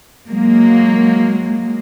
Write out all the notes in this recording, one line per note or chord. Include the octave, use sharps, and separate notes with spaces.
F#3 G#3 A#3